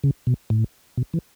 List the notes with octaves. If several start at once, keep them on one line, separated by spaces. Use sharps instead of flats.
C#3
B2
A2
B2
E3